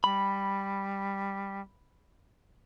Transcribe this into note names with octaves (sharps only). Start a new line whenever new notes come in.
G3 B5